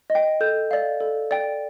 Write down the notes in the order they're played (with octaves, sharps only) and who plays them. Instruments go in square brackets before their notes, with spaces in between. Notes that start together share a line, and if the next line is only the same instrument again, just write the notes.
[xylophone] D#5
G5
A4 G6
D5 F5
A4
D5 G5